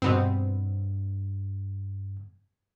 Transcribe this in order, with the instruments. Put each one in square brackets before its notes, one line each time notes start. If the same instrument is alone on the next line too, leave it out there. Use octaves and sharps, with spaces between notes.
[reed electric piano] G2 [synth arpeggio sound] B2 B3 C4